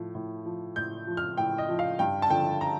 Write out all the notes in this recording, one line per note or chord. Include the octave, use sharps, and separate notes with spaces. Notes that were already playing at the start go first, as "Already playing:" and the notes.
Already playing: A2 F3
A2
F3
A2 G6
F3
F6
A2 G5
D#5
F3
F5
G2 G5
A5
D3 F3 G5
A#5